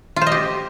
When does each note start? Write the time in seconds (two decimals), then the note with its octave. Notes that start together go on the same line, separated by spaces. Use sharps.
0.16 F4
0.21 C5
0.27 D#5
0.32 G4